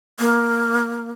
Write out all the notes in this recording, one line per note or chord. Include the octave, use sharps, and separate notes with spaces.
A#3